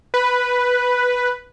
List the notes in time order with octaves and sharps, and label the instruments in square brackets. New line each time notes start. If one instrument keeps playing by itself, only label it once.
[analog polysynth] B4